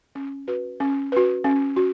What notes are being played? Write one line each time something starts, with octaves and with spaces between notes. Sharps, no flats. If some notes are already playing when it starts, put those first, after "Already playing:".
C#4
F#4 B4
C#4
F#4 B4
C#4
F#4